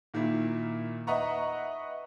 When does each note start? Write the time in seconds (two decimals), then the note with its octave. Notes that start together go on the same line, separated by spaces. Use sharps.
0.14 A#2 D#3 A#3 E4
1.07 B4 D#5 E5 F#5 A#5 C#6